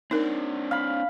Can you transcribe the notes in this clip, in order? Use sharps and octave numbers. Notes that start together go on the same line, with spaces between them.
C4 D4 D#4 A#4
F5 B5